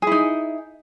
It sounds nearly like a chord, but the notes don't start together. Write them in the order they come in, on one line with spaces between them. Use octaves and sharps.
G#4 E4 D#4